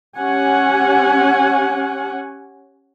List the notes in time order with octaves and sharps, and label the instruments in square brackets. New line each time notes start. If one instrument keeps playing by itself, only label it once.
[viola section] C#4 G4 F#5 G#5